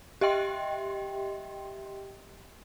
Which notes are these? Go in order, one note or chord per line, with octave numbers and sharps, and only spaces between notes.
G4 D#5 E5 G5 C6